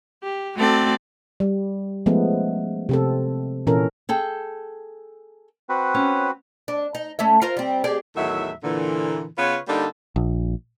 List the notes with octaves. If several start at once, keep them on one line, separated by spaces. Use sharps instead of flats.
G4
A3 C4 F#4 A4 D5
G3
F3 G#3 A3 B3 C#4
C3 C4 A4
A#2 E3 C#4 A4 A#4
G#4 A4 G5
C4 F#4 B4
C#4
D4
D#4
A3 C#4 E5
F4 A#4 C5
G3 C4
G4 G#4 D5
E2 A2 D#3 F#3 E5
A#2 D3 E3
C#3 B3 F4 B4 C#5
D3 G3 A#3 D4 D#4 A4
A#1